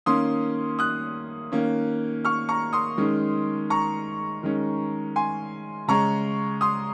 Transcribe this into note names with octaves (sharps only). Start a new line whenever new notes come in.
D#3 A#3 C#4 C6 D#6
D#6 F#6
D#3 A#3 C#4
C#6 F6
A#5 C#6
C6 D#6
D#3 G#3 C#4
A#5 C#6
D#3 G#3 C#4
G#5 C6
C#3 G#3 C#4 A#5 C#6
C6 D#6